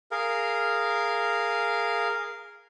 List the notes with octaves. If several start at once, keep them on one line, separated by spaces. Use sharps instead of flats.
G#4 A#4 F5